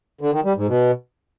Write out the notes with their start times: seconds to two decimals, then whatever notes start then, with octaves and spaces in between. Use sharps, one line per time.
0.21 D3
0.33 D#3
0.45 G3
0.57 G#2
0.69 B2